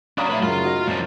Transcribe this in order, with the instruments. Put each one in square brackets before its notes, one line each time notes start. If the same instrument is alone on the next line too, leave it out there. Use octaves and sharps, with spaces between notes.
[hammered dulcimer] F#3 [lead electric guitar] C#4 D4 [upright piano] F5 D#6 [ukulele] B5
[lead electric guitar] A3 B5 [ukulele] B4 E5
[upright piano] F#2 C#3 [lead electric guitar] F4
[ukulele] D#4 F#4 D#5
[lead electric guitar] C2 F3 [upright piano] F#2 A6